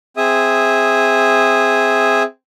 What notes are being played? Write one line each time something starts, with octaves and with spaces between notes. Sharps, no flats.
C4 G#4 E5 D#6